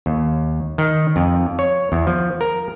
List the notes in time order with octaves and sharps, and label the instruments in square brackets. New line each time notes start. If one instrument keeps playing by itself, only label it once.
[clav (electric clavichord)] D#2
D#3
F2
C#5
E2
F3
A#4